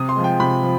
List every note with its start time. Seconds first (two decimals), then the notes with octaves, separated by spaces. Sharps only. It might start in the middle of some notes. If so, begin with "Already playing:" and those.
Already playing: C3 D#6
0.09 C6
0.16 F3 G#3
0.24 G5
0.40 C3 B5
0.63 F3